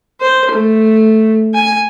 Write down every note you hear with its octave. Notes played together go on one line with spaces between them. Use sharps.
C5
A3
G#5